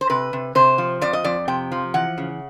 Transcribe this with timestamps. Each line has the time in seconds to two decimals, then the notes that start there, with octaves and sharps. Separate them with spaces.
0.01 C5
0.10 C3 B4
0.33 C3
0.55 C3 C5
0.78 F3
1.01 F2 D5
1.13 D#5
1.24 F2 D5
1.48 C3 G5
1.72 F3
1.94 E3 F#5
2.18 C#3